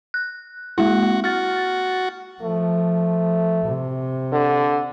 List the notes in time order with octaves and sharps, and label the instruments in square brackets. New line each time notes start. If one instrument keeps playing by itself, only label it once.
[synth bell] F#6
[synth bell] G#3 A#3 E4 [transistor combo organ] F#4
[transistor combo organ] F#4 [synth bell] F6 A6
[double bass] F3 [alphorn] A3
[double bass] C3
[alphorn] D3